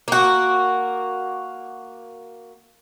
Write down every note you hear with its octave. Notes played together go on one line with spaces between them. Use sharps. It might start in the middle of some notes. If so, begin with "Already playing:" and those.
A#3 F#4